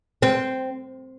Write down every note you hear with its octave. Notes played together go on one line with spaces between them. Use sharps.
C4